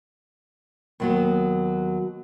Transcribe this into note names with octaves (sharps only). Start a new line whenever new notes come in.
D#2 F#3 B3